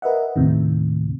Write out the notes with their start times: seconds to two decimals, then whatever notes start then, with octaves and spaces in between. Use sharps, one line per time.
0.02 A#4 B4 D#5 E5 F#5
0.36 D#2 A2 C3 D#3